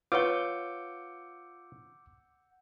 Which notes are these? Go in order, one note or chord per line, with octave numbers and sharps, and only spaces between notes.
F4 B4 C#5 F#5 C#6 D6 E6 G6